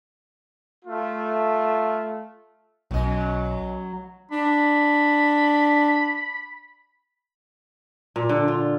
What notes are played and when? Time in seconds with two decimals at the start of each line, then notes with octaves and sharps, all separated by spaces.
0.85 A3 F4
2.91 B1 F#2 F#3 D#5
4.31 D4 B5
8.16 A#2
8.29 D3
8.48 F4